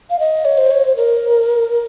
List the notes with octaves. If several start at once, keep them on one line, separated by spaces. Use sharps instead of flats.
F5
D#5
C#5
C5
C#5
C5
A#4